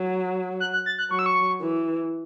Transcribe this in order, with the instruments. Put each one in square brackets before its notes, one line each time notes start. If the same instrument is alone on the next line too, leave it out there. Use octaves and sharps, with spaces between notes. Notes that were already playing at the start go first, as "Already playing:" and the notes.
Already playing: [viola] F#3
[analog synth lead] F#6
F#6
A6
F#6
[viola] F#3 [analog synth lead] C#6
[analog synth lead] E6
C#6
[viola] E3